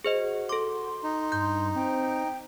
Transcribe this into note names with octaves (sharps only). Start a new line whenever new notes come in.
F#4 G#4 C5 D#5
A4 C6 D6
D#4
G2 G6
C4 G5